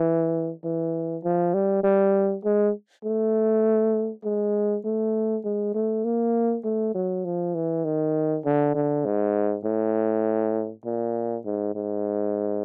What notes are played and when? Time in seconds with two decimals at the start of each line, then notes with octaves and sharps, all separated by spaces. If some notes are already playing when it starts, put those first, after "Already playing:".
Already playing: E3
0.64 E3
1.24 F3
1.54 G3
1.84 G3
2.44 G#3
3.04 A3
4.24 G#3
4.85 A3
5.44 G#3
5.74 A3
6.04 A#3
6.64 A3
6.95 F#3
7.25 F3
7.54 E3
7.85 D#3
8.45 D3
8.75 D3
9.05 G#2
9.64 A2
10.85 A#2
11.45 G#2
11.75 G#2